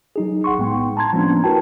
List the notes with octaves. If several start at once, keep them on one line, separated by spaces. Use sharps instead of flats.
F#3 D#4 G#4
A#1 F#5 C6 C#6
A2 G#3 B3 G5
A5 A#5 C6 G#6
F3 G#3 A#3 B3 C#4 D4
E4 F#4 A#4 B4 G5 A5